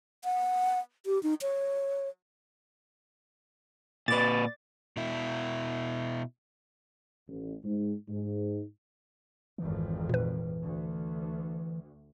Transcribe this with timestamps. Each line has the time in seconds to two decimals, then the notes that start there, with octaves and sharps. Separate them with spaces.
0.25 F#5
1.06 G4
1.23 D#4
1.42 C#5
4.08 A#2 B4 D5 A6
4.97 B2 E4
7.28 A1
7.64 G#2
8.09 G#2
9.58 G#1 F2 E3
10.09 A#2 B4
10.61 D2